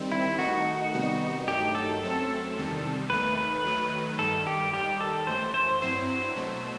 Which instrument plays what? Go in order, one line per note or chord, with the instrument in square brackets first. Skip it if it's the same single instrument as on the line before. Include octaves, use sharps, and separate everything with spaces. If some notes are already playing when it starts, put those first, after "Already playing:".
Already playing: [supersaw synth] D#3 G3 C4
[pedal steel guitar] E4
[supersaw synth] D#3 A3 D#4 [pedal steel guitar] F#4
[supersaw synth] C3 D#3 G3 B3 D#4
[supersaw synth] G2 D#3 F#3 A3 D#4 [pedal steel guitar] G4
[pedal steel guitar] A4
[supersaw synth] F#2 F#3 A3 C4
E2 C3 D#3 G3
[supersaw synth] D#2 D#3 A3 [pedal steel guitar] B4
[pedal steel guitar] B4
[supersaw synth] D#3 F#3 A3
[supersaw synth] G2 D#3 G3 [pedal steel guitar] A4
[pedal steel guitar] G4
[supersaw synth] D#2 D#3 G3 [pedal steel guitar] G4
[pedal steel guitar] A4
[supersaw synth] F#2 E3 A3 [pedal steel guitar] C5
[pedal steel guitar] C5
[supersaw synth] G2 F#3 C4 E4 [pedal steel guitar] C5
[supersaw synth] B2 F#3 A3